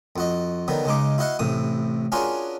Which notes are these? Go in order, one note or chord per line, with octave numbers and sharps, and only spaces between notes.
F2 F#4 D#5
D3 D#3 F#3 B3
C#3 G#3 D#4 D6
E4 F#4 D#5 F5 F#5
A1 A2 C3 D#6
C#4 D4 F4 F#4 G#4 A#4